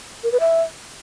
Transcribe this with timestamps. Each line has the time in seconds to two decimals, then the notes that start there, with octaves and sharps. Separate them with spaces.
0.24 A#4
0.32 B4
0.40 E5